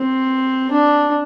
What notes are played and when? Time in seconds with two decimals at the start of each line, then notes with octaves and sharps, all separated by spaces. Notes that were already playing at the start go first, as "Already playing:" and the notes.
Already playing: C4
0.71 D4